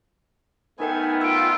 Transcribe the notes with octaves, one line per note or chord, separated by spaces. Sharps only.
D#3 A3 B3 D#4 A#4 G5 G#5
F4 E6 D7